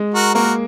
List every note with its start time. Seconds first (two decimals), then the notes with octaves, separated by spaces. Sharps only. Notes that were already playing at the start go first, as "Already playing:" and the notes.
Already playing: G#3
0.15 F#4 A#4
0.34 A#3 F#4 A#4